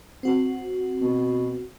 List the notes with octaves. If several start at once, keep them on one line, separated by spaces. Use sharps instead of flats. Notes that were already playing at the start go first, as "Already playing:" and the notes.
C4 F#4
B2